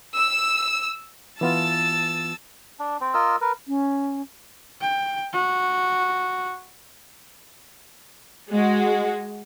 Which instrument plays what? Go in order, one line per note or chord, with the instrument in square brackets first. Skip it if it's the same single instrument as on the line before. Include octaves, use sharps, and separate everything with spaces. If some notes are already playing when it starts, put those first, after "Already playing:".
[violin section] E6
[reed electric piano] E3 B3 F4 [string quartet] A5 E6 A6
[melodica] D4
C4
F4 A#4 D#5 E6
A#4 B4
[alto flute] C#4
[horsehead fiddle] G5
F#4
[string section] G#3 F#4